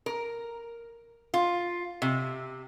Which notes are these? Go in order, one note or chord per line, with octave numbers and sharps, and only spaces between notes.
A#4
F4
C3